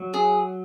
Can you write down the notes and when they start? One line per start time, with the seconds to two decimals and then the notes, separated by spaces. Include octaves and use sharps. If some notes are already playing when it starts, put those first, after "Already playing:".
Already playing: F#3
0.14 G#4